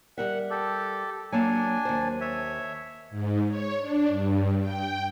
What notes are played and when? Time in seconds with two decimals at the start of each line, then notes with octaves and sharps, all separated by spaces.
0.18 G3 A#4 E5 F#5
0.50 G4 A4
1.32 F#3 A#3 D4 G#5 A5
1.85 D#2 C5
2.21 C#5 E5
3.10 G#2
3.48 C#5
3.79 D4
4.09 G2
4.60 G5